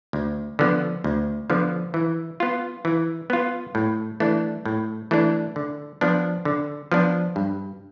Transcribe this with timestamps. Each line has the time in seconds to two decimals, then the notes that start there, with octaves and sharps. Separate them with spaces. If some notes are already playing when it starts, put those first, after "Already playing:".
0.13 D2
0.59 D3 F3 B3
1.04 D2
1.50 D3 F3 B3
1.94 E3
2.40 B3 F4
2.85 E3
3.30 B3 F4
3.75 A2
4.20 E3 A3 D4
4.65 A2
5.11 E3 A3 D4
5.56 D3
6.01 F3 B3 D4
6.45 D3
6.92 F3 B3 D4
7.36 G2